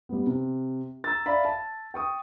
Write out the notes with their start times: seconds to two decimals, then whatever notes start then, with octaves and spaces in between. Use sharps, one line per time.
0.09 G3 B3
0.26 C3
1.04 A#5 E6 A6
1.26 D5 E5 F5 B5
1.45 A5
1.94 G5 C#6 D#6